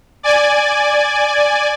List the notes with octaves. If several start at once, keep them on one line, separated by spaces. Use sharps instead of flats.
D5 G#5